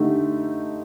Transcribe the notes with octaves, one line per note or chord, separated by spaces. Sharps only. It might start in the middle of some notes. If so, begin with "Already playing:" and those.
Already playing: D3 A3 D#4 G4